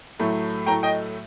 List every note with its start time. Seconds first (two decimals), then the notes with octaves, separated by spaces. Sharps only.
0.20 A2 F#3 A3
0.66 A2 F#3 A3 G5 A#5
0.83 D#5 G5